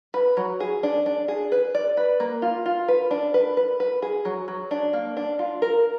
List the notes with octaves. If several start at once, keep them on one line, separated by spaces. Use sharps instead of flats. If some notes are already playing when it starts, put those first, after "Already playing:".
B4
F#3
G#4
D4
D4
G#4
B4
D5
B4
A#3
F4
F4
B4
D4
B4
B4
B4
G#4
F#3
F#3
D4
A#3
D4
F4
A#4